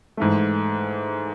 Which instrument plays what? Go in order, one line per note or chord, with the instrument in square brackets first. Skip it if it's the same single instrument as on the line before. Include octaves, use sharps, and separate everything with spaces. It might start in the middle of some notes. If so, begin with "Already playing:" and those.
[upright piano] G#2 E3 A3